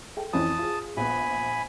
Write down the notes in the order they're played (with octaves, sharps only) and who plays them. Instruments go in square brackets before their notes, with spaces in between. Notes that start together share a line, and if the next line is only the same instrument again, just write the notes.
[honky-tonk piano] A4 G5
[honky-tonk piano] F2 E3 C#4 [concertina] A5 D#6
[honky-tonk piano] F4 G#4
[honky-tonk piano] A#1 B3 [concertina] G#5 B5